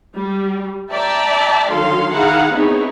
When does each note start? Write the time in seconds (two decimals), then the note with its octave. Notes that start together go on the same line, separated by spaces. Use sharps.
0.16 G3
0.92 D5 E5 G5 A5 A#5
1.69 D3 D#3 F#3 A4 F5 C6
2.13 D#3 E4 G#4 F5 F#5 A#5
2.54 B3 C4 D#4 E4 G#4 C#5